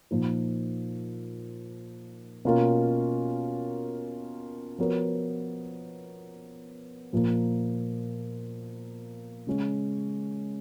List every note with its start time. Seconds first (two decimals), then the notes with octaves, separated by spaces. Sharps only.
0.11 A#2 F3 A#3 D#4
2.45 B2 A#3 C#4 F4 A#4
4.78 F3 B3 F#4 A#4 C#5
7.13 A#2 F3 A#3
9.47 C#3 G#3 C#4